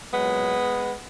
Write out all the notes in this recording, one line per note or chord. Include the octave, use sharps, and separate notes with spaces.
A#2 F#3 G#3 B3